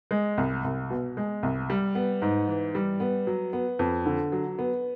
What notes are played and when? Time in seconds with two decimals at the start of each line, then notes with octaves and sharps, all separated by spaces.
0.11 G#3
0.38 C2
0.64 C2
0.90 B2
1.17 G#3
1.43 C2
1.70 G3
1.95 B3
2.22 G#2
2.48 E3
2.75 G3
3.00 B3
3.27 F#3
3.53 B3
3.79 F2
4.06 D3
4.32 F#3
4.59 B3